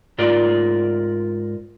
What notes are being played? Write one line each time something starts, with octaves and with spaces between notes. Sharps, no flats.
G#2 F4 A#4 D5